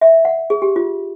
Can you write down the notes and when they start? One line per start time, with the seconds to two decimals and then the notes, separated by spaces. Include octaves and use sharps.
0.01 E5
0.25 F#5
0.50 G#4
0.62 G4
0.76 F4